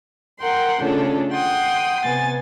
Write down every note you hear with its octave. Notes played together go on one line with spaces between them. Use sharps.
A#4 F#5 G5 C6
C#3 A3 C#4 D4 F4 A4
F#5 G5 C6 D#6
C3 B3 G#5 A6